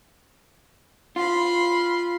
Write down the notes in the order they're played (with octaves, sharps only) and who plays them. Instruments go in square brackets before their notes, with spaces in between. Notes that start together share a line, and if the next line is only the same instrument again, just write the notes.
[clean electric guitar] F4 [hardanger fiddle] B5 C6